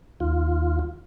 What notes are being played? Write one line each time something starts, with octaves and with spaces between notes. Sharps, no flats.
D#2 F4